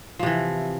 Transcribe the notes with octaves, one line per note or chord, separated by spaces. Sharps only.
C3 E3 F3